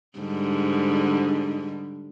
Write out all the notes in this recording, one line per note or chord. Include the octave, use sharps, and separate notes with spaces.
G#2 D3 G3